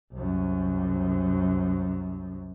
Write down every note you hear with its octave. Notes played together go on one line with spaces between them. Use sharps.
C2 F#2